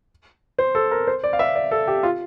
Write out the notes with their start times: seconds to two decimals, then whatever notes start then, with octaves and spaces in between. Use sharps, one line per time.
0.58 C5
0.75 A4
0.91 A#4
1.07 C5
1.24 D5
1.33 F5
1.39 E5
1.55 D5
1.71 A4
1.88 G4
2.03 F4